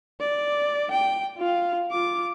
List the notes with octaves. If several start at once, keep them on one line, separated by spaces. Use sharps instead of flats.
D5
G5
F4 F5
F4 D6